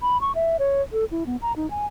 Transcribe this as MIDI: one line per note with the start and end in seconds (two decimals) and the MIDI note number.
0.02 0.20 83
0.21 0.32 85
0.35 0.57 76
0.59 0.82 73
0.93 1.05 69
1.11 1.26 64
1.26 1.37 59
1.42 1.53 82
1.56 1.69 63
1.71 1.86 80